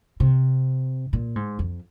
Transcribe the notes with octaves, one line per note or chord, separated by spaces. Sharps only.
C3
A#2
G#2
F2